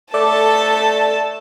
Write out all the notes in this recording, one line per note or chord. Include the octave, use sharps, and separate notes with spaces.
A3 A4 D5 A5